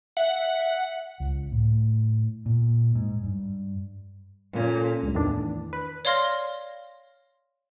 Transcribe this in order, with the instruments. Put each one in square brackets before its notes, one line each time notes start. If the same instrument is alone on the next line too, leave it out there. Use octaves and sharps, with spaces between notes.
[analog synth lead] E5 [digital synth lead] F#5
[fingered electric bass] C#2
A2
A#2
G#2
G2
[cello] A#2 [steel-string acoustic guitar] C#4 A4
[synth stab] C#2 G2
E2 A2 D#3 E3 D4
B4
[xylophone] C#5 D5 F5 C6 F6 A#6